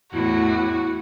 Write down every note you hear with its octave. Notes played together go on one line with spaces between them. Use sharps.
E2 A2 E4 F#4